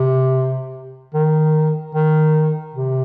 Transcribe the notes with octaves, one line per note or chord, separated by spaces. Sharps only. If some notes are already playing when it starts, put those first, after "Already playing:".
Already playing: C3
D#3
D#3
C3